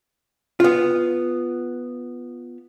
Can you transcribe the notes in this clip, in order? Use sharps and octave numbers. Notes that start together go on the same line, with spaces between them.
B3 F4